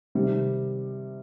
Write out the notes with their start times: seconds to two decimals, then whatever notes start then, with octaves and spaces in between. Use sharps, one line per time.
0.15 C3 D#3 G3